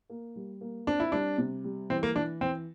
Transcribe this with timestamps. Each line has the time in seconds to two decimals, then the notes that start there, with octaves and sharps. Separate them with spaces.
0.10 A#3
0.36 G3
0.61 A#3
0.87 C4 D4
1.00 E4
1.12 G3 D4
1.38 C3
1.64 G3
1.90 E3 C4
2.03 A#3
2.16 E3 D4
2.41 E3 C4